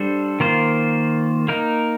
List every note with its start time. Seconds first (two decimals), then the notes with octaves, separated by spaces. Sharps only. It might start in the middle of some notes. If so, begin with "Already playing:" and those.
Already playing: G3 D4 A4 C5
0.40 D#3 A#3 F4 C5
1.48 A#3 D#4 A#4